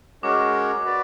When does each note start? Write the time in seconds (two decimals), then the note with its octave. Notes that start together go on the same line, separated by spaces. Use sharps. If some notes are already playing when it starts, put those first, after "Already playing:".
0.23 G#3 C#4 F#4 A#4 C#5 D6
0.85 F#4 B4 D5